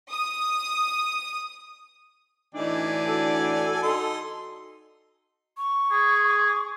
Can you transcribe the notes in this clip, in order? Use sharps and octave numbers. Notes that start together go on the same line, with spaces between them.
D#6
D2 A2 E3 D4 D#4 D5 G#5
F#4 A4
D#4 C6
C#6
G#4